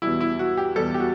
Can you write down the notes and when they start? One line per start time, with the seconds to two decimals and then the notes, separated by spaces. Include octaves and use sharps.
0.02 E2 B2 G3 E4
0.21 E4
0.39 F#4
0.57 G4
0.76 E2 B2 G3 A4
0.94 G4
1.00 F#4